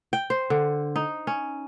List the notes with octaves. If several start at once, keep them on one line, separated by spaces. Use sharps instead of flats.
G5
C5
D3
D#4
C#4